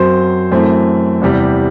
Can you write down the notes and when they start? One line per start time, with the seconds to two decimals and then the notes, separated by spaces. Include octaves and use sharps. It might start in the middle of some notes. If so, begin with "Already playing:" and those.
Already playing: F#2 F#3 C4 C5 C6
0.51 F#2 E3 A3 C4
1.21 E2 C3 G3